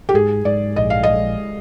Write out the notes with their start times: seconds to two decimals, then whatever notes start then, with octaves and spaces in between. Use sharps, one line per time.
0.09 G4
0.14 G#2 G#4
0.45 G#2 D5
0.76 A#1 D#5
0.90 F5
1.03 G#3 D#5